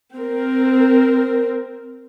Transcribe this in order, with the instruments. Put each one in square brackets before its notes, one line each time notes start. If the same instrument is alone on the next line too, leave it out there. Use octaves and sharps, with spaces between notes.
[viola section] C4 A#4